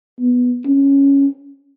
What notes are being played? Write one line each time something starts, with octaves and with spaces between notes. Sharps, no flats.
B3
C#4